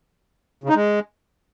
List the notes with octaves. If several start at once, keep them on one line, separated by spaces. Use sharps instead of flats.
C#3
D#4
G#3